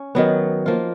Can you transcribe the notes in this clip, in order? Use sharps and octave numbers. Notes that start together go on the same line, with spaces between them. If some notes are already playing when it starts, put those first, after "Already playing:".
Already playing: C#4
D#3 F#3 B3
F3 A#3 F4